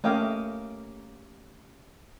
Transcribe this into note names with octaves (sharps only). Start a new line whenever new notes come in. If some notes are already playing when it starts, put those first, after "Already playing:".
A3 A#3 C#4 G4 D#5 F5